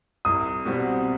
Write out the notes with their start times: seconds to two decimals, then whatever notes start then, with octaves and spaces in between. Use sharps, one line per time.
0.25 C2 D#6
0.65 B2 G3 C4 F#4